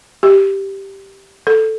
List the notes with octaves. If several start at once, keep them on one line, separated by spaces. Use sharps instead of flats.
G4
A4